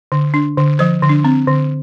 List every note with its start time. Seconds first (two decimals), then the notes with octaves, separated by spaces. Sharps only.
0.12 D3
0.34 D4
0.58 D3
0.79 F3 C5
1.02 D3
1.09 D4
1.24 C4
1.47 D3